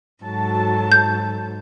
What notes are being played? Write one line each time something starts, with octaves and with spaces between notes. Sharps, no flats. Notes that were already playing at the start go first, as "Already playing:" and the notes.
G#2 F#3 A4 A5
G6